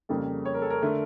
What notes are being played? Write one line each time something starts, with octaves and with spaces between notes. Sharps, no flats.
F2 C#3 G3 A#3 A4
C#5
A#4
A4
A#4
D3 A3